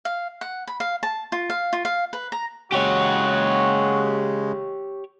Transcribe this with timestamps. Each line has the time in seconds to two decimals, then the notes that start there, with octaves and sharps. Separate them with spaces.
0.05 F5
0.41 F#5
0.67 B5
0.80 F5
1.03 A5
1.32 F4
1.50 F5
1.73 F4
1.85 F5
2.13 B4
2.32 A#5
2.73 C#3 G#3 F#4 G4 C#5